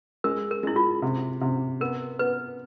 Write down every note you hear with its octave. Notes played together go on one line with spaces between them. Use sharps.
G#3 A#4
A#4
G#3 E4
F4
C3
C3
B3 A#4
B3 B4